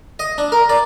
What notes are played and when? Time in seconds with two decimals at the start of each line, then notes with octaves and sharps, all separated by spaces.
0.19 D#5
0.38 D4
0.52 A#4
0.69 D5